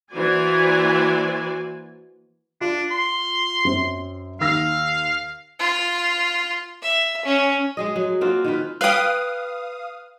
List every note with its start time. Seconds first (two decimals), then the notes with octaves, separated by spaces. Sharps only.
0.12 E3 A#3 F#4 C5 D5 G#5
2.61 D4 F4
2.91 C6
3.65 F#2 C4
4.41 D#2 F5 E6 A#6
5.59 F4
6.82 E5
7.25 C#4
7.77 G#3 G#4 D#5
7.96 F#3
8.21 A#3 C4 F4 F#4
8.44 D#3 F4 B4
8.81 B4 F5 G5 D#6